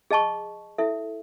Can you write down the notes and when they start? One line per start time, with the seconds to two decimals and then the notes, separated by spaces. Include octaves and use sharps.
0.11 G#4 D#5 A5 C#6
0.78 E4 A4 E5